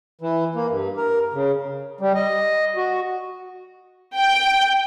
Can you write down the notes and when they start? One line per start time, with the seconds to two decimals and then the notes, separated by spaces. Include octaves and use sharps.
0.21 E3
0.55 A#3
0.70 G2
0.97 A#4
1.33 C#3
2.01 G3
2.15 D#5
2.76 F#4
4.17 G5